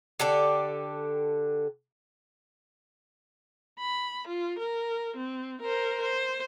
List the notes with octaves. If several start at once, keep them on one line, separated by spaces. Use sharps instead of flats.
D3 G4 A4 D5
B5
F4
A#4
C4
A#4 C5
C5